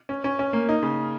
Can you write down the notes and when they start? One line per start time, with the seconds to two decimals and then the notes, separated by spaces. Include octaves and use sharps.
0.09 C#4
0.24 C#4
0.39 C#4
0.53 A#3
0.69 D#4
0.83 C#3